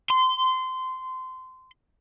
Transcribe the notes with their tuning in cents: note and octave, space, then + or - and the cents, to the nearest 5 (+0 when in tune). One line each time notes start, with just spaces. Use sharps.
C6 -20